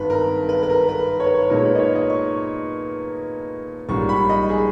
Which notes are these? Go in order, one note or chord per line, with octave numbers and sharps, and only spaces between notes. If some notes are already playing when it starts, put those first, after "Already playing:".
Already playing: G#1 G2 D#3 B4
A#4
B4
B4
A#4
B4
C#5
B4
C#5
A#2 G#3 D#4 A#4
C#5
B4
D#5
C#5
D#5
C#6
A#1 G#2 G3 C#4 C#6
B5
D#5
G#4